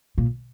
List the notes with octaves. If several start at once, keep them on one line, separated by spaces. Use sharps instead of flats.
A#2